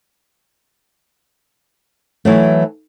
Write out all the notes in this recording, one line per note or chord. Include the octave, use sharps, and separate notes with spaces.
E3 F#3 A3